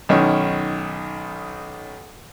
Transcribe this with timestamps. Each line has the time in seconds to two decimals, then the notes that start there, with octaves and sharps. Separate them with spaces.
0.09 B1 D#3 C#4